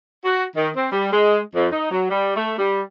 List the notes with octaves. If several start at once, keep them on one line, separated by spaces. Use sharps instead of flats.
F#4
D#3
C4
G3
G#3
F2
D#4
F#3
G3
A3
G3